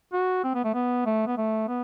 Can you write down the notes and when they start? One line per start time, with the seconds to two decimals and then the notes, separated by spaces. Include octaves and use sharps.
0.13 F#4
0.44 C4
0.54 B3
0.64 A3
0.74 B3
1.06 A3
1.27 B3
1.37 A3
1.68 B3